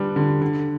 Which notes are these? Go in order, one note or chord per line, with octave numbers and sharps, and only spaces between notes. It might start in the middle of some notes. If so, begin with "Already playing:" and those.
Already playing: D3 G3 B3 D4
D3
D3